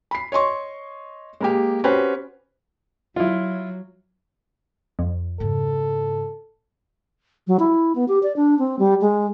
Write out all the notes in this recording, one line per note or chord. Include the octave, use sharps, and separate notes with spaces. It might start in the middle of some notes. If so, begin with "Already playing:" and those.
B5 C7
C#5 D#5 C6 C#6
G#3 A#3 G4
C4 C#4 F#4 G4 B4 C5
F#3 E4 F4
F2
G#2 C#3 A4
F#3
E4
B3
G4
D5
D4
C4
G3
G#3